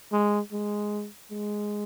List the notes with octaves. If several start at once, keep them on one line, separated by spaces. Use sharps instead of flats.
G#3
G#3
G#3